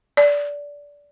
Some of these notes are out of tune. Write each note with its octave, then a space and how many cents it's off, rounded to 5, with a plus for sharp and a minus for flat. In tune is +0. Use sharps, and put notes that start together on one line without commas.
D5 -20